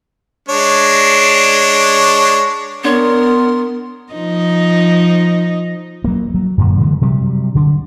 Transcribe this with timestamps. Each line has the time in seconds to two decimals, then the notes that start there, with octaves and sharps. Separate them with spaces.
0.49 G#3 D4 C#5
2.84 B3 D4 A#4 C#5 C6
4.13 F3 D#4 D#5
6.04 F#3 A#3
6.34 F#3
6.58 F#2 A#2 D3
6.79 D3 E3 G#3
7.01 C3 F#3 G3
7.55 D3 D4